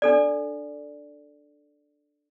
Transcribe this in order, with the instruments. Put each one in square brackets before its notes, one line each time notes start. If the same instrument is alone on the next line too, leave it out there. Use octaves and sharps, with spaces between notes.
[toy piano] D4 A4 D5